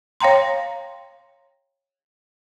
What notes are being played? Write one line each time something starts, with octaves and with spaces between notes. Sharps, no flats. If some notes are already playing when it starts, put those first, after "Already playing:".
C#5 F5 G5 A#5 C6